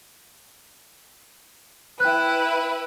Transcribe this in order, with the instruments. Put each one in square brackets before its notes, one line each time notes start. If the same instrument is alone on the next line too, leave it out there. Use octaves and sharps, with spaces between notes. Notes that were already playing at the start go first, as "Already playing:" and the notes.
[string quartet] E4 B4 [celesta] G5 F#6